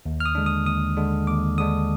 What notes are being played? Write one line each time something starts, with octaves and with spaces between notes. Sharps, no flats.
D#2
F6
D#6
D3 G#3 D4
D#6
D#2 D#6
D3 G#3 D4
D#2 D6
D3 G#3 D4 D#6